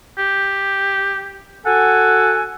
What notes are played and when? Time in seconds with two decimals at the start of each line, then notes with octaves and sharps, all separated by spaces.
0.18 G4
1.66 F#4 A4 F#5 G#5